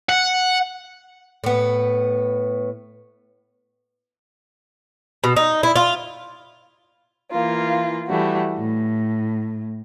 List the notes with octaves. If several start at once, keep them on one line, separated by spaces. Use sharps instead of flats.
F#5
A2 B3
B2
D#4
E4
F4
E3 A#3 F4
E3 G3 A3 F#4
A2